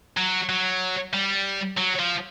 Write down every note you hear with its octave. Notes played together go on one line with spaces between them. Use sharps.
F#3
F#3
G3
F#3
F3